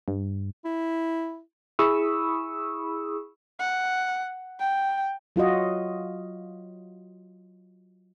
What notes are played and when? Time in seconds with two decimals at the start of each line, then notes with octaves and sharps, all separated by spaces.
0.08 G2
0.65 E4
1.79 E4 G#4 B5 C#6 D#6 E6
3.59 F#5
4.59 G5
5.36 F#3 F4 F#4 D#5